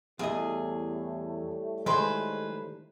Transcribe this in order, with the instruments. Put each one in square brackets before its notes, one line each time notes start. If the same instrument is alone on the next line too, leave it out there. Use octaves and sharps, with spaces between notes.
[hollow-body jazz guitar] E2 D#5 [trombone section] A2 G3 A3 [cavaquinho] G#4
[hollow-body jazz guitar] D#3 C6 [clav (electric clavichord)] G#3 [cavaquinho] B4 C5 G#5